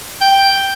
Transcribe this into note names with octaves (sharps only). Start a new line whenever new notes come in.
G5